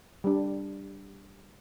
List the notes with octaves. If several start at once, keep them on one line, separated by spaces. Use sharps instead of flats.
G3 D4